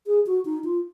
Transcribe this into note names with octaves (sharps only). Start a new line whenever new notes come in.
G#4
F#4
D#4
F4